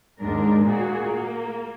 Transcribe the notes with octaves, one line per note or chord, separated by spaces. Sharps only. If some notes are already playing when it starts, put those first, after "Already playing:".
D#2 G#2 G#3 D4 A#4
A#2 A#3 F#4 G#4
A#3